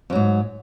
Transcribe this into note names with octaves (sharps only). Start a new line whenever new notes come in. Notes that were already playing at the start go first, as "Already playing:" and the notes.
F2 G#2 F#3